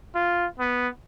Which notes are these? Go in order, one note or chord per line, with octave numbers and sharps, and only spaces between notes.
F4
B3